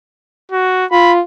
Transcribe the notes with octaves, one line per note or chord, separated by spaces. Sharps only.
F#4
F4 B5